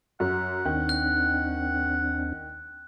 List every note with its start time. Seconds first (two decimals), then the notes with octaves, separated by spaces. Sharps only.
0.20 F#2 F#5
0.65 D#2 D#3 C4 D4
0.89 F#6